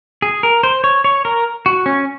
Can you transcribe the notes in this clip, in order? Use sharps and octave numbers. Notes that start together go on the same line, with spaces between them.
G#4
A#4
C5
C#5
C#5
A#4
F#4
C#4